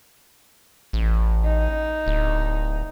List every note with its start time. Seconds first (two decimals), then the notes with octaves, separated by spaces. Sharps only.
0.93 A1
1.44 D#4
2.07 D1